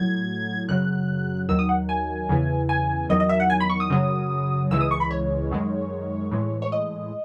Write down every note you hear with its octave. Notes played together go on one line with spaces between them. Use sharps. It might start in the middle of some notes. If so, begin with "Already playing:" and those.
Already playing: A2 F#3 G#6
F#2 C#3 F#3 F#6
D#2 D#3 F#3 E6
D#6
F#5
G#5
E2 C#3 E3
G#5
E2 D#3 F#3 D#5
D#5
E5
F#5
G#5
B5
C#6
D#6
F#2 C#3 F#3
C#2 C#3 E3 G#3 E6
D#6
C#6
B5
C#5
F#2 D#3 G#3
A2 E3 G#3
C#5
D#5